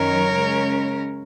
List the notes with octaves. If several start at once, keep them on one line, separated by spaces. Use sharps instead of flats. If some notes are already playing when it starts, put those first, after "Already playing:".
Already playing: F#2 D#3 F#3 C#4 A#4 C#5
C#3 G#3 C#4